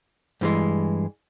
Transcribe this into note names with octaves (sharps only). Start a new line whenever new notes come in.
G2 E3 G#3